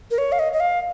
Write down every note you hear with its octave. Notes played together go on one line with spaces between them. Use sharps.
A#4
C#5
F5
D#5
D#5
F5